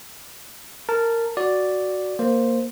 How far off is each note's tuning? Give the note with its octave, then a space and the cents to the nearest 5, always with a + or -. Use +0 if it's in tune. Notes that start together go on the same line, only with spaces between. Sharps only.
A#4 -15 A5 +0
F#4 +0 D5 +0
A#3 -5 C5 +0